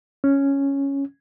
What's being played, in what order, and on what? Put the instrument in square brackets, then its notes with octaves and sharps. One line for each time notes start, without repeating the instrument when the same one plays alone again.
[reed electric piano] C#4